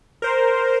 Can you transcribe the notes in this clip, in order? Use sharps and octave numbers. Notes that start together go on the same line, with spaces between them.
A#4 C5